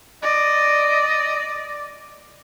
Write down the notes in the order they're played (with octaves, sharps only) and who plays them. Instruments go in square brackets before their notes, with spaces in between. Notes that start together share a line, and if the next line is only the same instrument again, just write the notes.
[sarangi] D5 [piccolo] D#5